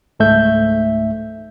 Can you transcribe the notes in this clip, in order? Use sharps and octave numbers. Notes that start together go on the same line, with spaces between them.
C#2 G#2 A3 E5 G6